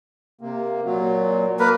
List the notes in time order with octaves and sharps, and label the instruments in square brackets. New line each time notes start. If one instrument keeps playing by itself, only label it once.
[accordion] C3 A#3
A#2 F#3
[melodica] A#3 A#4 B4